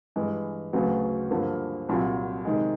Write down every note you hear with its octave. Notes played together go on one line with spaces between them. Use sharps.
G2 E3 G#3
D2 C#3 F#3 B3
G2 D3 F3 A#3
C2 A#2 F#3
C3 D#3 G#3